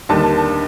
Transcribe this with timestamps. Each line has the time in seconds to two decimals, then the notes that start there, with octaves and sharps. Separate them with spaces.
0.09 D#2 D3 G3 D4 A5
0.24 A5
0.37 A5